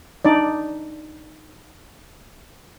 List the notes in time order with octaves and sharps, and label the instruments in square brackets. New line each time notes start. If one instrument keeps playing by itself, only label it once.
[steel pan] D4 D#4 D5